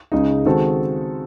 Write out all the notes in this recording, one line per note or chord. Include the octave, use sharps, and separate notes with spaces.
C#2 C#3 G#3 D#4
D#3 G#3 C4 F#4 A4